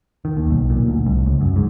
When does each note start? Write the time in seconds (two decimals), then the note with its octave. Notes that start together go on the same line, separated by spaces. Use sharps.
0.25 D#3
0.37 D#2
0.51 B1
0.70 A#2
0.87 D2
1.06 C2
1.26 C#2
1.41 F#2
1.56 G#2